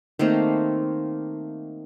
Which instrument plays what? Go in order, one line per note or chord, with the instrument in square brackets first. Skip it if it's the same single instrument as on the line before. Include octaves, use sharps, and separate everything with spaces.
[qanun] D#3 A3 A#3 C4